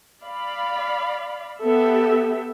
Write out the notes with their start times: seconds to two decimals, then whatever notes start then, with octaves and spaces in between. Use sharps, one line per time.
0.24 D5 F5 B5
1.62 B3 G4 A4 E5